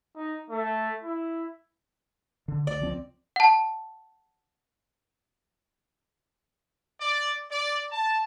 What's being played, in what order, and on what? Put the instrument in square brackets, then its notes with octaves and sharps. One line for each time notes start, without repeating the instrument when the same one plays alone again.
[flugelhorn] D#4
A3
E4
[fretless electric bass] D3
[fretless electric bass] D2 [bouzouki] D5
[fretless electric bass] C#2 F3 C4
[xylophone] F#5 A5
[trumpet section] D5
D5
A5